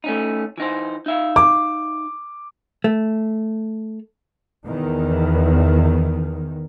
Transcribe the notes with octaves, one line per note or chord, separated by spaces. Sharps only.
A3 C#4 D#4
E3 D#4 C5
D#4 E5 F5
D6
A3
E2 D#3